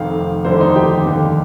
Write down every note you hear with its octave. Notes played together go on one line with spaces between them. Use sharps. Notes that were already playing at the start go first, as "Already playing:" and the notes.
Already playing: F1 F2 C3 D#3 F5
F1 D#2 D3 G3 C5
D#4
G4
F1 D#2 D3